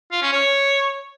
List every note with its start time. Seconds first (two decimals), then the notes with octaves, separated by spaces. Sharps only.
0.12 F4
0.22 C#4
0.33 C#5